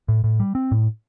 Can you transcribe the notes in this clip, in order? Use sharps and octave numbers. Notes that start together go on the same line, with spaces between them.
A2
A2
G3
C4
A2